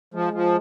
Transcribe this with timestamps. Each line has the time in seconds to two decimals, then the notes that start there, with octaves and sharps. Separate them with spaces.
0.14 F3 G#3
0.33 F3